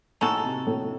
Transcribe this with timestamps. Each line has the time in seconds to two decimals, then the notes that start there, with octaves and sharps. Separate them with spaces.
0.21 A2 G#3 D#4 F#4 A4
0.44 C3
0.67 A2